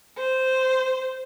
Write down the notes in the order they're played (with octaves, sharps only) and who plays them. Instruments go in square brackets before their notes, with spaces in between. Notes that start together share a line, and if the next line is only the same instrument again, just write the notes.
[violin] C5